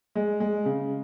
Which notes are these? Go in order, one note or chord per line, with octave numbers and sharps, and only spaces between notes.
G#3
G#3
C#3